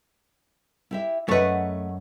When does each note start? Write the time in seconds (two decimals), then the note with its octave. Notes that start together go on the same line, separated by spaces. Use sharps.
0.91 E4 G4 E5
1.29 F#2 A3 B4 D#5 F#5